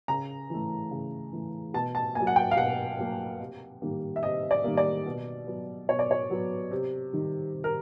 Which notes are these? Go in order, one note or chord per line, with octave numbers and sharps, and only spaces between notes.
C#3 A#5
E3 A3
C#3
E3 A3
B2 A5
A5
A#3 G#5
F#3
F#5
G5
F5
B2 F#5
F#3 A#3
C3
D#3 G3 A#3
E5
C3 D#5
D5
D#3 G3 A#3
D5
B2
F#3 B3
B2 C#5
D5
C#5
F#3 B3
C3
D#3 G3
C3
A#4